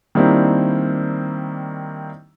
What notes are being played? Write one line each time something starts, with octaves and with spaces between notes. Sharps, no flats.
D#3 G3 A#3 C4 D4 E4